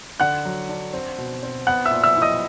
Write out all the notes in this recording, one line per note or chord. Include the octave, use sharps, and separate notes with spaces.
D3 F#5 F#6
F#3
D4
C4
B2
C4
B3 F#5 F#6
E5 E6
A#2
E5 E6
E4
D#5 D#6